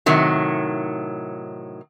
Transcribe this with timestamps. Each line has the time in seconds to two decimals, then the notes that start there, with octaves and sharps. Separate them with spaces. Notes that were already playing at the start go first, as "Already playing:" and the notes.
0.06 A2 C3 D#3 F#3